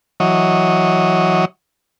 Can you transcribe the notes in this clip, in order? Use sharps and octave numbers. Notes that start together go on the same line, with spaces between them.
E3 F#3 C#5 D#5